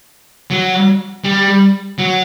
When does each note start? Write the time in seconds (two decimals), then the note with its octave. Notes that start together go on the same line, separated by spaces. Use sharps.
0.51 F#3
1.24 G3
1.98 F#3